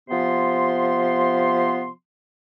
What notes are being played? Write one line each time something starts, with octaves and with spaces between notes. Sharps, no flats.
C3 F3 B3 C6